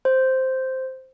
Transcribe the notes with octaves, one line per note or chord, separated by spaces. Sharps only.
C5